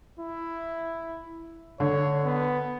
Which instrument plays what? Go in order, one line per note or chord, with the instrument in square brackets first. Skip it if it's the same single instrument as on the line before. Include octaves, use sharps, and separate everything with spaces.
[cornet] E4
[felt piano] D3 [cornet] C#5
[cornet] B3